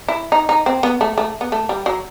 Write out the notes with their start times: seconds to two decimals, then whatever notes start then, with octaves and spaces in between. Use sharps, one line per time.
0.08 E4
0.32 D#4
0.49 D#4
0.66 C4
0.83 B3
1.01 A3
1.18 A3
1.41 B3
1.52 A3
1.69 G3
1.86 F#3